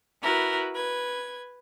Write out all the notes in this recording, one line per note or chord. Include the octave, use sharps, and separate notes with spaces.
E4 F#4 A#4 B4
B4 G#6